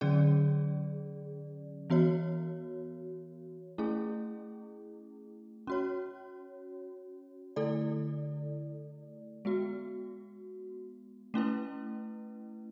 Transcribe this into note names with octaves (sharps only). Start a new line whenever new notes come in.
D3 F#3 C#4 G#4 D5
E3 B3 F#4 C#5
A3 C#4 E4 G#4
C#4 F#4 C#5
D3 A3 E4 A4 D5
G#3 B3 F#4
A3 C#4 E4 B4